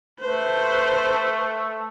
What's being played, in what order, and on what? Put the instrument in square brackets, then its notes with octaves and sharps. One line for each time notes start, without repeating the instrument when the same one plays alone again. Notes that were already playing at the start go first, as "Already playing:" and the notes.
[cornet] A3 [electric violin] B4 C5